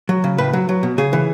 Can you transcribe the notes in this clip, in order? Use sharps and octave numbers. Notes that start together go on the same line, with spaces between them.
F#3
C#3
A2 B4
F#3
F#3
B2
C#3 G#4
E3